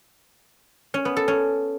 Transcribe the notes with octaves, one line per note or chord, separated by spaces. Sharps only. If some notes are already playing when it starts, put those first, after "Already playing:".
C#4
B3
A4
C#4